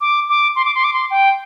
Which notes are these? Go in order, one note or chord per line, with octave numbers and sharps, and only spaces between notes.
D6
D6
C6
D6
C6
D6
C6
G5